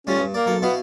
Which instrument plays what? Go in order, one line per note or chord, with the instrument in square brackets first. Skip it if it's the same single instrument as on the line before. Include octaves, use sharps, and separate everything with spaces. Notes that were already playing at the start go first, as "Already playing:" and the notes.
[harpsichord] A2 G3 F4 [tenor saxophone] C#4
[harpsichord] G2
[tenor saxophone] A#3 [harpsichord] D5
[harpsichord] B1 A4
[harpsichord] B2 E4 F5 [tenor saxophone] B3